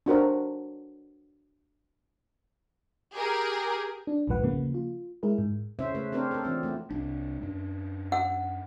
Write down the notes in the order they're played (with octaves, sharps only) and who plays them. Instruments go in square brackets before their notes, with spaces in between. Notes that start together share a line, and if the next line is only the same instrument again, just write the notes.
[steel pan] D4 F#4 A#4 C5
[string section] G4 G#4 A#4
[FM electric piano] D4
A#1 D#2 G#2 F3 B4 F#5
C#3 F3 A#3
F4
G#3 E4 G#4 A#4
G#2
[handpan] C#3 C#4 E4 C5 E5
A3 B4
C4 D4 A#4 C5 C#5
A4 A#4
E3 F3 B3 C4 D4
A3 B3
[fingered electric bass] C2 D4
F#2 D4
[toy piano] F#5